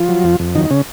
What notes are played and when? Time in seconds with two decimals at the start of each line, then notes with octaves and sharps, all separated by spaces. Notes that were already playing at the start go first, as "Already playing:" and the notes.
Already playing: F3 F4
0.09 F#3
0.24 F2
0.40 F2
0.55 F#2 D#3 D#4
0.65 D#4
0.71 C#3 C#4